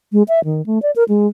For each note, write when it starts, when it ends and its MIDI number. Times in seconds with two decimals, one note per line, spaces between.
0.12 0.23 56
0.28 0.43 76
0.45 0.65 51
0.66 0.81 57
0.82 0.91 74
0.96 1.04 70
1.09 1.27 56